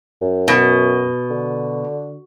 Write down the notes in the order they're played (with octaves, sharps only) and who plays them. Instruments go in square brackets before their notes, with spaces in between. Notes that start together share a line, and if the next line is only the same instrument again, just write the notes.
[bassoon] F#2
[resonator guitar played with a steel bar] B2
[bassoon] D3